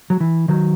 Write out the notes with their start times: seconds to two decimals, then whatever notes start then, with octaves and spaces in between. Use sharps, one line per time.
0.10 F#3
0.21 E3
0.48 D#3 F#3